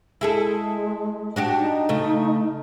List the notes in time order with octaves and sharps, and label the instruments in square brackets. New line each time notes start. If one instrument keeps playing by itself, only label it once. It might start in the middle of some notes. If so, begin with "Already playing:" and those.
[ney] G#3 [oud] E4 G#4 A4
[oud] D4 F#4 G4
[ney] D#4
[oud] C#3 A3